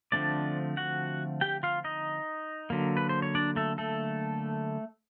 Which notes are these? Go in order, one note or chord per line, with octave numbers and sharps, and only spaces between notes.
D3 F3 A3 C4 D4 D5
F#4 F#5
G4 G5
F4 F5
D#4 D#5
D3 F#3 A#3
B4
C5
C#5
D4 D5
A3 A4
A3 A4